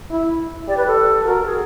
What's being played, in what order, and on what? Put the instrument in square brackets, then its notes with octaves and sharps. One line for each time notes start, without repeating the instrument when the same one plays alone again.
[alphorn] E4
[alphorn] G4 [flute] D5
[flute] B4
A4
[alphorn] F#4 [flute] A#4
[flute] G#4